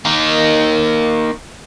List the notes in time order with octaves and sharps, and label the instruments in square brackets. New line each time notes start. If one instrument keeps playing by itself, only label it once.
[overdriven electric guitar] A#3 D#4